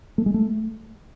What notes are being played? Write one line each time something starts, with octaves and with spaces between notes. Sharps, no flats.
A3
G#3
A3